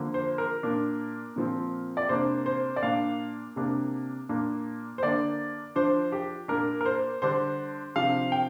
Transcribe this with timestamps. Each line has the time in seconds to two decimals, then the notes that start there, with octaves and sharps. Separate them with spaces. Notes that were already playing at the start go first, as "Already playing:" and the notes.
Already playing: D3 F3 A#3
0.14 C5
0.38 A#4
0.63 A#2 A#3 D4
1.36 A#2 F3 C4
1.97 D5
2.09 C3 A#3 D4 C5
2.46 C5
2.76 D5
2.83 A#2 A#3 D4 F5
3.56 C3 A#3 D4
4.29 A#2 A#3 D4
4.98 C5
5.02 D3 A#3 D4 D5
5.76 F3 D4 C5
6.12 G4
6.48 A#2 A#3 D4 A#4
6.81 A#4
6.86 C5
7.22 D3 G3 D4 C5
7.96 C3 F3 D4 F5
8.32 G5